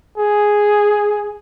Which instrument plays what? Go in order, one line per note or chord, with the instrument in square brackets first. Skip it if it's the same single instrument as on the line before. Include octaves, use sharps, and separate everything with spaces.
[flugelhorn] G#4